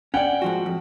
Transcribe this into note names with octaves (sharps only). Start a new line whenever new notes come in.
C#4 D5 F#5 G5
G#2 F3 F#4
F2